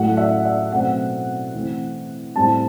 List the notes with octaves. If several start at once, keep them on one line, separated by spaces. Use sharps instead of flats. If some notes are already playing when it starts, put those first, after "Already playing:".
Already playing: A2 F#3 A3 F#5
E5
E5
B2 F#3 A3 C4 F#5
E3 A3 C4
A2 G3 C4 A5